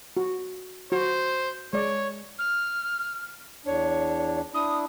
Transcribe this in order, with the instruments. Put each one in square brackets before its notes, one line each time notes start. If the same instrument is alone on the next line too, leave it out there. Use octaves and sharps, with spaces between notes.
[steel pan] F#4
[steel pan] F#4 [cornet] C5
[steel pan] G#3 D5 [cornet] C#5
[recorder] F6
[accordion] E2 D4 [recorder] C#5
[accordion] D4 E4 [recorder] D#6